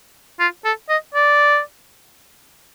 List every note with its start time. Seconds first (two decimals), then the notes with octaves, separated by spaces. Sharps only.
0.40 F4
0.64 A4
0.89 D#5
1.14 D5